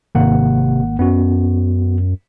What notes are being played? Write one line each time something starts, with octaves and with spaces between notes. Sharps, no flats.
G#1 C3 A#3 F#5
F#2 B3 C#4 F#4